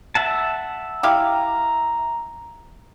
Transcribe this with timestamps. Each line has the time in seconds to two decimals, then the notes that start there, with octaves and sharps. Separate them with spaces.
0.15 E5 F#5 A5
1.03 E4 G4 F5 A#5